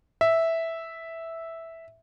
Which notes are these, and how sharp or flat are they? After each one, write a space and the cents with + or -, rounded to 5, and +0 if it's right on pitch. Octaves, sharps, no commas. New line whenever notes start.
E5 -5